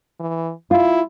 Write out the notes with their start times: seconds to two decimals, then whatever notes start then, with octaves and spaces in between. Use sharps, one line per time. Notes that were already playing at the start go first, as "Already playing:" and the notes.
0.20 E3
0.71 E4 F4